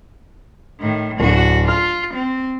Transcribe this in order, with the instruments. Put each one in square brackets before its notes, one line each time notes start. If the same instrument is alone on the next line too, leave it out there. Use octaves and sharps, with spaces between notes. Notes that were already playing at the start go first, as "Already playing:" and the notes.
[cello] A2 D#3
[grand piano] D1 [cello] D4 F#4
[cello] F4 [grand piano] F6
[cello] C4